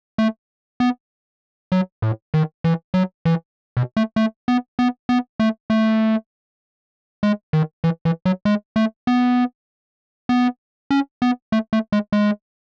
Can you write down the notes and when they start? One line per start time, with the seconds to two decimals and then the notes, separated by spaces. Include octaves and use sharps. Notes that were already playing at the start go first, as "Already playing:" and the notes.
0.18 A3
0.80 B3
1.72 F#3
2.02 A2
2.34 D#3
2.64 E3
2.94 F#3
3.25 E3
3.77 B2
3.97 A3
4.16 A3
4.48 B3
4.79 B3
5.09 B3
5.40 A3
5.70 A3
7.23 G#3
7.53 D#3
7.84 E3
8.05 E3
8.25 F#3
8.45 G#3
8.76 A3
9.07 B3
10.29 B3
10.91 C#4
11.22 B3
11.52 A3
11.73 A3
11.92 G#3
12.12 G#3